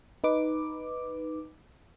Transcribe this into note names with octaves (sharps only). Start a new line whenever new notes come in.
D#4 B4 D6